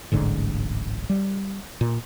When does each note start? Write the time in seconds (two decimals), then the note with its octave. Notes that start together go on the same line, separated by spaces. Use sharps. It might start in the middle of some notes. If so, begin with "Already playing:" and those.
0.12 D1 A1 G#2 D3
1.10 G3
1.81 A#2